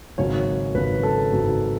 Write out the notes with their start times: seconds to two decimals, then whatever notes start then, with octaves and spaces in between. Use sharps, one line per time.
0.18 G#1 F#2 C#3 F#3 C#5
0.75 G#1 F#2 C#3 F#3 B4
1.03 A4
1.32 G#1 F#2 C#3 F#3